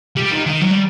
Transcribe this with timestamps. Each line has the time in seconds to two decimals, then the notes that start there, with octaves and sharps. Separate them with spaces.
0.17 G3
0.31 D#3
0.45 D#3
0.61 F#3
0.70 G3